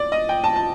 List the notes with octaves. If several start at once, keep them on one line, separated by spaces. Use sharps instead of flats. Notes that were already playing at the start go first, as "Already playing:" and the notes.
Already playing: D5
D#5
G5
A5
A5